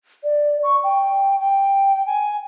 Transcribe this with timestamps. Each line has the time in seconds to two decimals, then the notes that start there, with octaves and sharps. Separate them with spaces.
0.24 D5
0.63 C#6
0.84 G5
1.40 G5
2.06 G#5